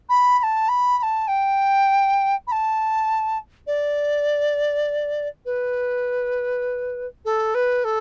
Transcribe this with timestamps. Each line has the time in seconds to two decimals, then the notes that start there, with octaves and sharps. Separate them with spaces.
0.09 B5
0.38 B5
0.43 A5
0.68 B5
0.98 B5
1.02 A5
1.27 G5
2.47 B5
2.51 A5
3.66 D5
5.45 B4
7.25 A4
7.54 B4
7.84 A4